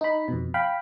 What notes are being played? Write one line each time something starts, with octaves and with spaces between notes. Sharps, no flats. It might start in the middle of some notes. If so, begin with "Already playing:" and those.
D#4 B5
F2 B2
F5 G5 B5